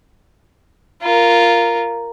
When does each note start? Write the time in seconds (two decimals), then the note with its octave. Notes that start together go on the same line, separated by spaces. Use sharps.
1.02 F4 A#4